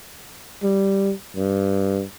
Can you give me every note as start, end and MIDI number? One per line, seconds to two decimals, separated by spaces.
0.63 1.13 55
1.36 2.03 43